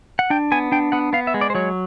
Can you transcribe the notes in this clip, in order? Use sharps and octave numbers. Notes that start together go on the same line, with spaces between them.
F#5
D4 G5
B3 G#5
D4 G5
B3 F#5
B3 F5
E5
G#3
D5
C5
F#3 C#5